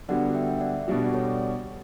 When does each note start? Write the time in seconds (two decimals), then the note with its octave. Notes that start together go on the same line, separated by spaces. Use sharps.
0.09 D3 G3 B3 F#4 D5 F#5
0.35 E5 G5
0.56 E5
0.61 D5 F#5
0.88 B2 G3 D4 F#4
1.04 D5
1.13 A4 C#5